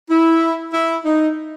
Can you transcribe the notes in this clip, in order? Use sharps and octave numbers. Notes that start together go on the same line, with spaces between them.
E4
E4
D#4